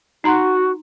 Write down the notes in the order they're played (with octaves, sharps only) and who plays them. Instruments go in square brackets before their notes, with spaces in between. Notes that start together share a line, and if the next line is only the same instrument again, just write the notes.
[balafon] D#4 A#5 C6 [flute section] F#4